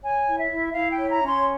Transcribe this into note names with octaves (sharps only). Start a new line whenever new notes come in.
C#5 G#5
E4
E5
E4
E4 F5
G5
C#5
A#5
C#4
C6